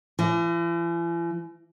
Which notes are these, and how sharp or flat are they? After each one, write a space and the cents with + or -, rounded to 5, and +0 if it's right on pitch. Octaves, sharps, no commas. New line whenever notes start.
E3 +45